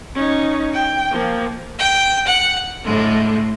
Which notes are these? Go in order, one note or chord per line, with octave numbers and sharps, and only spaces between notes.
C#4 D#4
G5
F3 A#3
G5
F#5
A2 D3 G#3